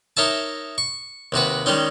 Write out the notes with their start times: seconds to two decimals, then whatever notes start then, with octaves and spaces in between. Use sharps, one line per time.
0.17 D#4 A#4 C#5 E5 A5
0.78 C#6
1.32 D#2 C3 F#4 B4
1.66 D#3 G3 G#3 C#4 D#4